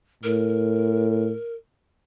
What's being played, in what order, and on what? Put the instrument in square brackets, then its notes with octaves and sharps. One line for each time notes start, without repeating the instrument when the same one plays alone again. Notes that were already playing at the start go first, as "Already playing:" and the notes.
[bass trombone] A2 [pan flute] A#4